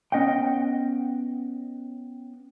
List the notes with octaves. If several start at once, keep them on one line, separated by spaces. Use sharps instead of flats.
B3 C#4 D#5 F#5 G5